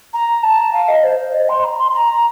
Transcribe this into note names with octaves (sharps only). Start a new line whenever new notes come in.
A#5
A5
F5
D#5
C5
C5
D#5
C6
A#5
C6
C6
A#5